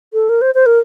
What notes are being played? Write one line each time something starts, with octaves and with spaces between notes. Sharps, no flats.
A4
A#4
C5
C5
A#4